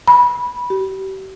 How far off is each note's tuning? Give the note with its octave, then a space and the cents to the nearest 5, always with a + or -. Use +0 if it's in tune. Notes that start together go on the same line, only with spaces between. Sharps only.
B5 -15
G4 -40